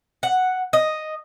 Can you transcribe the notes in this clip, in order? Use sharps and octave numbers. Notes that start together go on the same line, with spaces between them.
F#5
D#5